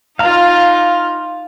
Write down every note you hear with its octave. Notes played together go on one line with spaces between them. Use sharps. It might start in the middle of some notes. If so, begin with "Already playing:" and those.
D#4 F4 F5 A#5